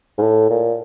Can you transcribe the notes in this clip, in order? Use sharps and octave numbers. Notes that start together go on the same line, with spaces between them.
G#2
A2
A#2